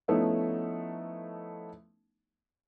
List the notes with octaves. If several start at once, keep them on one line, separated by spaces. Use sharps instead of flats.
F3 A3 B3 C#4 D#4 E4